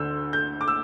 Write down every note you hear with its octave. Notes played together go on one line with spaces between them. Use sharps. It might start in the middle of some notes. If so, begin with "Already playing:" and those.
Already playing: D2 D3 E6 G6
G6
D6
E6